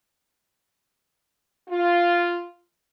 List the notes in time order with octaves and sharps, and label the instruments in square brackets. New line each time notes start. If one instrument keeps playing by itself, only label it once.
[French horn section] F4